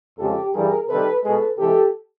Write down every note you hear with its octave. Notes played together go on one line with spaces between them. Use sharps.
F2 C#3 F3 G#3 G4 A4
G2 E3 G3 G#4 A#4
C3 D#3 G3 A4 B4
B2 G#3 A4 B4
C3 E3 G#3 G4 A4